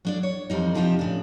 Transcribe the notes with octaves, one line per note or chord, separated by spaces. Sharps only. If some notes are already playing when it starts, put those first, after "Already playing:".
F#3 D4 D5
C#5
F2 E3 G3 D#4
C3 F3 D4 D#4 F4 G4
A2 C#3 D4